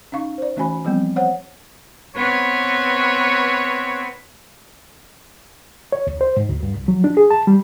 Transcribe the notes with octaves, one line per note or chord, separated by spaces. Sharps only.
C#4 D#4 F5 C#6
C5 D5
E3 A3 C#4 F#4 G#5 B5
F3 G3 B3 C4
C5 C#5 F#5
B3 C4 B4 C#5
C#5
D2
C5
G#2
D2
G2
C2
F#3
D4
G#4
A5
G3